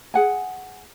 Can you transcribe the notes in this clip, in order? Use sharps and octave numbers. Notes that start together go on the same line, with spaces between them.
G#4 F#5 G#5